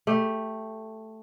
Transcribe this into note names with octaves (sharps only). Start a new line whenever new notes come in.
A3 G4